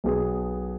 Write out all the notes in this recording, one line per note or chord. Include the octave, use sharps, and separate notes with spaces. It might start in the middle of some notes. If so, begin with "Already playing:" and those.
B1 B2 B3 G#4